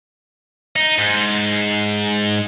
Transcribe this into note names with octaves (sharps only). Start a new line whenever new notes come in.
D#4
G#2